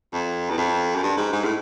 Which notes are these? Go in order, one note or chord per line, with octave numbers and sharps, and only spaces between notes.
F2
E2
F2
F#2
G2
G#2
G#2
A2